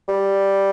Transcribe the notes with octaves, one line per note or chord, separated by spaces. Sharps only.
G3